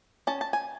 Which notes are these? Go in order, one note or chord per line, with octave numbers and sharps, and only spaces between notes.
C#4 A5
A5
G#5